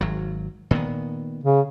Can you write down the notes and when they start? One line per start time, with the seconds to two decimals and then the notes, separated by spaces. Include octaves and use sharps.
0.01 G#1 F#3
0.71 A#2 D#3 B3
1.43 C#3